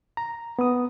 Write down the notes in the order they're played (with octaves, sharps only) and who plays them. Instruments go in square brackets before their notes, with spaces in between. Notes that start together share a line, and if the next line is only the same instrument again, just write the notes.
[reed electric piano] A#5
B3 D#6